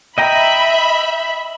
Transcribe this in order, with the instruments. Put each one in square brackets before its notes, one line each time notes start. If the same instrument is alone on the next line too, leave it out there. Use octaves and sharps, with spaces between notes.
[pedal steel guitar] D#5 G5 A#5 [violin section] E5 B5